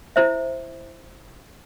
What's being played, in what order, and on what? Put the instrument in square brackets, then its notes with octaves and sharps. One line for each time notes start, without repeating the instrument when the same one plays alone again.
[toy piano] E4 C5 E5